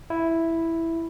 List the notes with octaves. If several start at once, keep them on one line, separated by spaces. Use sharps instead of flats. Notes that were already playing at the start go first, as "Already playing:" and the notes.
E4